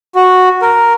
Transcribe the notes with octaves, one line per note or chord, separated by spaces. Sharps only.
F#4
A#4